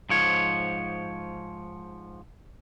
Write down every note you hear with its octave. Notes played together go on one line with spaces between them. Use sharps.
G#2 F3 C#5